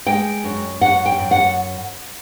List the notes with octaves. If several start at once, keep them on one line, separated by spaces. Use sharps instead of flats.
G#3 G5
F#2
F#2 F#5
G5
F#2
F#5